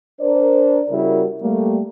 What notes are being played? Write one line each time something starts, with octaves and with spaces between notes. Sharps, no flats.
D4 A#4 C5 D5
C#3 G3 E4 F#4 A#4
G3 A3 A#3